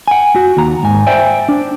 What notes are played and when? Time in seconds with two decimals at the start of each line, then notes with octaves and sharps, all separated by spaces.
0.08 F#5 G#5
0.36 F#4
0.57 D#2 A#5
0.83 G#2 G#5
1.07 C5 D5 E5 G5 G#5
1.49 D4